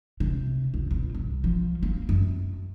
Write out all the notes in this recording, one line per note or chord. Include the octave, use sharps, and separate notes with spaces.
C3
C#2
B2
C2
F3
A#3
F#2